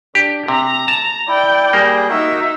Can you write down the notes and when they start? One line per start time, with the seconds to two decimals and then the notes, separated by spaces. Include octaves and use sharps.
0.15 D4 G4
0.48 C3 A#5
0.88 A5
1.28 E4 D5 G5
1.73 G3 A#3 G#4
2.10 D#4 F#4 A#4 E5